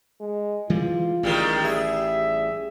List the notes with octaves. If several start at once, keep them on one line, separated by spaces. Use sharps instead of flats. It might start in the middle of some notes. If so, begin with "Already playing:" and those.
G#3
E3 G3 G#3 F4
A1 D#3 G3 G#3
G3 G#4 E5